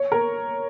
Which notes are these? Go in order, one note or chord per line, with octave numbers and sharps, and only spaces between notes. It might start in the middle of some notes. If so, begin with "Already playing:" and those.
Already playing: C#5
A#4